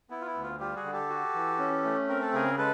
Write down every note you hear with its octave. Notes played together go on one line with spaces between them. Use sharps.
B3 E4
F4
E4
D2
F4
G3 F4 G4
F#4 G#4
D3
G4 A4
F#4
E3
C#4
A3
C4 A#4
A4
C#3 G#4 A#4
G#3 A4 B4